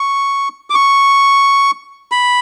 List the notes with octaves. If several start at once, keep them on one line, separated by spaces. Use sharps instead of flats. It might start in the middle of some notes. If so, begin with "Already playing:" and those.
Already playing: C#6
D6
C#6
B5